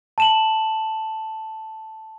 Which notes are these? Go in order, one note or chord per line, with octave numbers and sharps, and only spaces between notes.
A5 E7 F#7